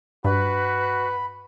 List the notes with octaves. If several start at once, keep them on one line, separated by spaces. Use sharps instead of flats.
G2 F#4 B4 B5